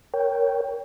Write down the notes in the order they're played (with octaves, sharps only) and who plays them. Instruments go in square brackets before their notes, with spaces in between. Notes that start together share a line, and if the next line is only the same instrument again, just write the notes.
[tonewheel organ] A#4 C#5 G5